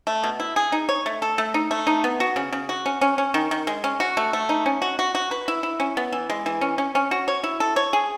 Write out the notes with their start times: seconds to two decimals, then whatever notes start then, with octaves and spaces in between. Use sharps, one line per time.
0.07 A3
0.23 B2
0.40 E4
0.56 G#4
0.72 D#4
0.89 C#5
1.06 A3
1.22 A4
1.38 A3
1.54 D#4
1.71 A3
1.87 D#4
2.04 B3
2.20 F#4
2.36 C#3
2.53 C#3
2.69 F#4
2.86 C#4
3.01 C#4
3.18 C#4
3.34 D#3
3.51 D#3
3.67 G#3
3.84 C#4
4.00 F#4
4.17 A3
4.33 A3
4.49 D#4
4.66 C#4
4.82 F#4
4.99 F#4
5.15 F#4
5.31 B4
5.48 E4
5.63 E4
5.80 C#4
5.97 B3
6.12 E3
6.30 G#3
6.46 E3
6.61 C#4
6.78 C#4
6.95 C#4
7.11 F#4
7.28 C#5
7.44 E4
7.60 A4
7.76 C#5
7.93 G#4